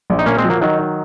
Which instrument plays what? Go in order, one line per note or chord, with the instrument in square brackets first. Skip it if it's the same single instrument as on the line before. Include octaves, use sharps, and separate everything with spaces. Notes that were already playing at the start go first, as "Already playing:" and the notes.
[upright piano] A#1
[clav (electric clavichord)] D#4
[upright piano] A#2 [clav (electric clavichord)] A#3 C#4
[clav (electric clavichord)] G#3 C4
[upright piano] F3
[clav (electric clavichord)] F#3 A#3
[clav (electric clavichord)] D#3 F#3 [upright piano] D#4
[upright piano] D#4